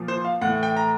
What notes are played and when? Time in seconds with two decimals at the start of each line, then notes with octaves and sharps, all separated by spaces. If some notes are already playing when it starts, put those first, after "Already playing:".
Already playing: A#2 F3
0.08 C5
0.25 F5
0.41 A2 F#5
0.45 E3
0.63 G5
0.77 A#5